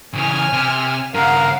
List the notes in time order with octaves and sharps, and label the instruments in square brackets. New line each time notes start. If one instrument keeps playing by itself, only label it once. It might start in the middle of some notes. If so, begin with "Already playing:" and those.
[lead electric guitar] C#3 E3 [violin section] G#5 F6
[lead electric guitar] C3
[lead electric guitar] G2 C#3 [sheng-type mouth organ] A#4 [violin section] F5 F#5